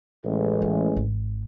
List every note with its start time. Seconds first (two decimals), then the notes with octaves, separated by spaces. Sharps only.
0.25 A1 G#3
0.62 E3
0.96 G#1